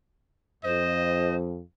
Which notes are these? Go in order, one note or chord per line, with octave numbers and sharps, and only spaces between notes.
F2 C5 D#5